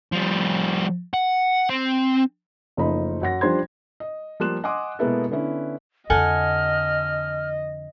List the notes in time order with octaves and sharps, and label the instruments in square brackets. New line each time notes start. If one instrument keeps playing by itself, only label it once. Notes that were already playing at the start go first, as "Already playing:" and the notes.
[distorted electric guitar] F3 G3
F#5
C4
[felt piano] F#1 F3 A3 D#4 B5
F#2 F#5 A#6
F3 G3 D4 C5 C6 G#6
D#5
F3 G3 A#3 C6 F#6 E7
D#5 F#5 G#5 C6 D6 D#6
B2 G#3 A#3 B3 E4 A4
D3 B3 C#4 E4
[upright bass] F2 D3 [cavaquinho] A4 F#5 G#5 [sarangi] D#5 [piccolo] F6